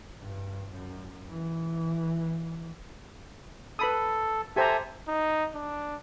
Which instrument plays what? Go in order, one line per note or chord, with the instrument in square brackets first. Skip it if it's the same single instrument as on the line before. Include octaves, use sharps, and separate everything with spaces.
[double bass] G2
F#2
E3
[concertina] A4 [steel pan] B4 B5 D#6
[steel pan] G4 C5 A#5 [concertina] A4 E5 G#5
[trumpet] D#4
D4